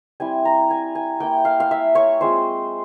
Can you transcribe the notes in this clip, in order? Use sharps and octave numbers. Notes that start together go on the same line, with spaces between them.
G3 C4 E4 G#5
A#5
G#5
G#5
A#3 E4 G5
F5
F5
E5
C#5
G#3 C4 F4 C5